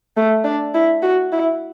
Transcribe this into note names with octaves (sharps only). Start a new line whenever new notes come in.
A3
D4
E4
F#4
E4